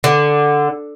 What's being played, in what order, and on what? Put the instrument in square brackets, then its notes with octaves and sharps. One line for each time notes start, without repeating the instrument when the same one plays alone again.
[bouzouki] D3